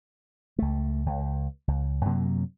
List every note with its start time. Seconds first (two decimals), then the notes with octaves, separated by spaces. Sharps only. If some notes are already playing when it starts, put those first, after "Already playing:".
0.59 C#2 A3
1.06 C#2
1.68 C#2
2.05 F#2 C3 F#3 A#3